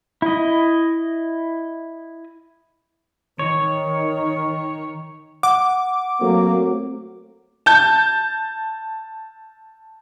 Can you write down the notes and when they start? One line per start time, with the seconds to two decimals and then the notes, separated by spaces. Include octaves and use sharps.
0.22 E4 D#5
3.39 D#3 C#5
5.43 F#5 D6
6.21 F#3 A3 A#3 C4 F#4
7.66 A5 G6